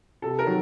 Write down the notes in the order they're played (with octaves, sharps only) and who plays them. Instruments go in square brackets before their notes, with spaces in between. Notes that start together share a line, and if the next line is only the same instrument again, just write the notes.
[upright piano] C3 A4
A#4
D#3 F#3